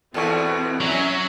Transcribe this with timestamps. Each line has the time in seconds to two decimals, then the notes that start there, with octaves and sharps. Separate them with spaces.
0.14 E2 B2 E3 C4 F4 A4 C#6
0.80 F#3 C#4 E5 G#5